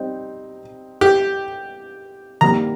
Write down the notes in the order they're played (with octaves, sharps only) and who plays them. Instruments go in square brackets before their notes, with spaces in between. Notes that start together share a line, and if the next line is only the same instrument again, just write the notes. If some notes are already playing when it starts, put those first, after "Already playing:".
Already playing: [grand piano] G3 C4 D#4
[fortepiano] G4
[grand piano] D#3 G3 A#3 [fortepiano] A#5